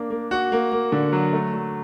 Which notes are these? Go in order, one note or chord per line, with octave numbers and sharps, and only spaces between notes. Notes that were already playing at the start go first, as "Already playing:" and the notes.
Already playing: A#3 D4
A#3
F#4
A#3
A#3
D3
F#3
A3
F#3